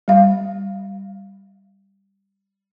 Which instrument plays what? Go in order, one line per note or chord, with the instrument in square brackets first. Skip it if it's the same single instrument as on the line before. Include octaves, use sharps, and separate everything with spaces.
[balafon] G3 F5